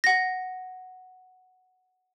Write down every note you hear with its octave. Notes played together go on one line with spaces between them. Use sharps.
F#5 A#6